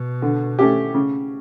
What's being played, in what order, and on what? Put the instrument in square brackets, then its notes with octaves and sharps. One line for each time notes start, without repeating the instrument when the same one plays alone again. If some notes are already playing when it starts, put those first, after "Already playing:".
Already playing: [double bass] B2
[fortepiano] D3
A3 C#4 G4
C#3